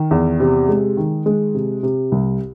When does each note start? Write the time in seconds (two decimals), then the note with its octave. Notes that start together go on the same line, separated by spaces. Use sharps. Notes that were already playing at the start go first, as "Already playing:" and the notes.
Already playing: D#3
0.11 E2
0.40 C3
0.69 G#3
0.97 D#3
1.26 G#3
1.54 C3
1.83 C3
2.12 C2